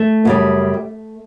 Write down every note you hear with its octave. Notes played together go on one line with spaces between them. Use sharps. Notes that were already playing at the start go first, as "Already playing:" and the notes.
Already playing: A3
F#2 C#3 G3